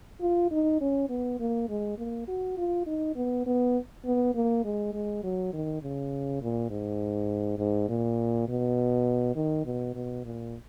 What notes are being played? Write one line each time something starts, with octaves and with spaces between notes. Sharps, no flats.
F4
D#4
C#4
B3
A#3
G#3
A#3
F#4
F4
D#4
B3
B3
B3
A#3
G#3
G#3
F#3
D#3
C#3
A#2
G#2
G#2
A#2
B2
D#3
B2
B2
A#2